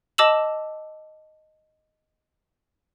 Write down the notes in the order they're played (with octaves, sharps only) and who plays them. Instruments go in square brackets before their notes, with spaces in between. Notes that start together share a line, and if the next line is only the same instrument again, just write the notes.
[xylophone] D#5 A5 D6 E6 E7 F#7